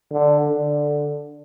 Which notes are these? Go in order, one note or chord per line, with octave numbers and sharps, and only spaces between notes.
D3
D3